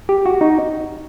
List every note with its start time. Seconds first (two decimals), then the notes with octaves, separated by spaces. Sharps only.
0.09 G4
0.26 F#4
0.41 D#4